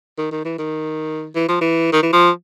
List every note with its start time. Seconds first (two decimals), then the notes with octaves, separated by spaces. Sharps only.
0.18 D#3
0.32 D#3
0.45 E3
0.58 D#3
1.35 E3
1.49 F3
1.61 E3
1.92 D#3
2.03 E3
2.13 F3